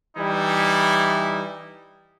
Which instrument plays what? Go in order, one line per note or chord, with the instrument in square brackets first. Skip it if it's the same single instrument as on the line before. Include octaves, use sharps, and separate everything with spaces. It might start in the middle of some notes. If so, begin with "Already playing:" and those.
[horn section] E3 G3 D#4 E4